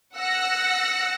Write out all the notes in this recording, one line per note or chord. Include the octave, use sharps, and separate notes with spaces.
F#5 E6 F#6 A#6 C#7